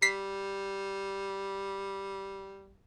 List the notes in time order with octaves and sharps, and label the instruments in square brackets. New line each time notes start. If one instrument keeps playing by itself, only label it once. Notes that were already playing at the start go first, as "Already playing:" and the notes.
[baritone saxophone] G3 [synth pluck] B6 C7